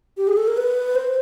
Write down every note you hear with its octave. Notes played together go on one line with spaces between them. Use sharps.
G4
G#4
A4
A#4
B4
C5